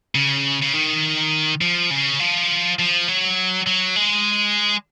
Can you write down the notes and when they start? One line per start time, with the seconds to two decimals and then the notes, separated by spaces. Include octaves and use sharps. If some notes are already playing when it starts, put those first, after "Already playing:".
0.15 C#3
0.62 C#3
0.73 D#3
1.61 F3
1.91 C#3
2.20 F3
2.79 F3
3.08 F#3
3.67 F#3
3.96 G#3